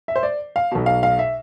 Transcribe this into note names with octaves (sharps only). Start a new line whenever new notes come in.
E5
C5
D5
F5
B1 B2
F5
F5
E5